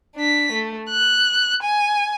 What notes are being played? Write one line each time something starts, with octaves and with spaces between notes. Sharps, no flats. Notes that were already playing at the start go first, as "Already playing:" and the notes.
D4 B6
A3
F#6
G#5